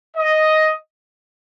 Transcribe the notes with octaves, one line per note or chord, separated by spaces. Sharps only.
D#5